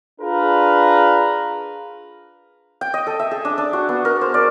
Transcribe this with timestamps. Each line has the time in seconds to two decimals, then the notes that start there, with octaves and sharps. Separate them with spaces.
0.20 D4 F4 G#4 A#4 B4
2.81 G5
2.94 D#5
3.07 A4
3.19 E5
3.31 G#4
3.45 D4
3.58 D4
3.73 F#4
3.89 B3
4.05 A#4
4.21 C5
4.34 D5